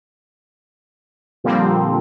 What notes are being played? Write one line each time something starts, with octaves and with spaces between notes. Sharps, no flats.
A#2 D3 F3 G3 A#3 C4